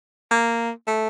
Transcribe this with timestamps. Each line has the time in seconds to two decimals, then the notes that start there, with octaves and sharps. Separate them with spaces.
0.31 A#3
0.87 A3